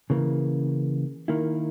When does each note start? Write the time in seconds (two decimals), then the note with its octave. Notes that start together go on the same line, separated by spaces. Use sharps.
0.10 C#3 E3 A#3
1.28 D#3 A#3 E4